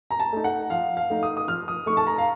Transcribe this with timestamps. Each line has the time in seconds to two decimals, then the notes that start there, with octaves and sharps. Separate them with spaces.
0.11 A#5
0.20 A5
0.33 A3 D#4
0.44 F#5
0.70 F3 F5
0.97 F5
1.10 A3 D#4
1.23 D#6
1.37 D#6
1.48 F3 F6
1.68 D#6
1.86 A3 D#4 C#6
1.97 A5
2.07 A#5
2.18 F5